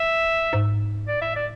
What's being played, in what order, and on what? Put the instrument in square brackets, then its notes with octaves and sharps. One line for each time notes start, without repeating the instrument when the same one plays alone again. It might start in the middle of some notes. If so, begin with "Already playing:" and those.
Already playing: [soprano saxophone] E5
[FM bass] G#2
[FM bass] A2 [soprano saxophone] D5
[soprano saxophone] E5
D5